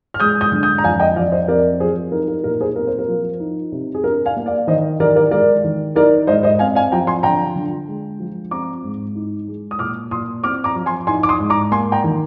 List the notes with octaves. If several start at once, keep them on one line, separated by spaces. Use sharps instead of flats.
F6
G#3 D#6 G6
D#6 G6
D3
D#6 G6
A#5
F2 F5 G#5
D#5 G5
F2 D5 F5
C5 D#5
C4 A#4 D5
F3 G#4 C5
D#4 A#4
A#4
A#2 A#4
G#4 C5
C4 A#4
C5
A#4
F3
D#4
C3
G#4
D4 A#4
F5 G#5
A#3
D5 F5
D#3 C5 D#5
D#3 A#4 D5
A#4 D5
G#3 A#4 D5
D#3
D#4 A#4 D5
G#2 C5 D#5
C5 D#5
C4 F5 G#5
F5 G#5
F3 G5 A#5
G#5 C6
D3 G5 A#5
D3
G#3
F3
C4 A#5 D6
G#2
D#4
G#3
D#6
A#2 D6 F6
A#2 C6 D#6
C4 D6 F6
A#5 D6
F3
G#5 C6
D#4 G#5 C6
D6
C6 D#6
G#2
A#5 D6
A#3 G#5 C6
G5 A#5
D#3